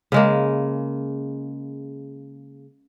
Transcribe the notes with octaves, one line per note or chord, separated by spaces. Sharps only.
C#3 G#3 A#3